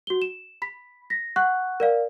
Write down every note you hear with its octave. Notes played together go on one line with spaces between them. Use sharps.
F#4 G7
E7
B5 B6
A#6 B6
F#5 C#6 F#6
A#4 D5 F5